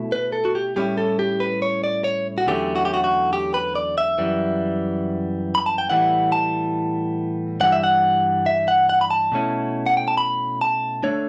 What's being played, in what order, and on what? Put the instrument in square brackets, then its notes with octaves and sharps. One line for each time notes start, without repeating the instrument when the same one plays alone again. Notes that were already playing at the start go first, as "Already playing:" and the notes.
Already playing: [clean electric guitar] B2 A3 E4
B4
A4
F#4
G4
A2 G3 C#4 E4 G4
A4
G4
B4
C#5
D5
C#5
F#4
E2 D3 F#3 A3 C#4 G4
F#4
G4
F#4
F#4
G4
B4
D5
E5
F#2 E3 G3
B5
A5
G5
A2 E3 G3 B3 E4 F#5
A5
G2 E3 G3 F#5
E5
F#5
E5
F#5
F#5
B5
A5
B2 A3 C#4 E4
F#5
G5
A5
B5
A5
D3 A3 D4 C#5